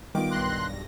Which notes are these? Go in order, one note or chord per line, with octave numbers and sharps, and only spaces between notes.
D#3 G3 B3 F4 D6
B1 G2 C6 F#6 A#6